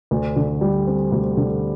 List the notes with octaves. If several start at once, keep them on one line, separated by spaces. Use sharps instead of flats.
D2
D3
G3
C4
D2
D3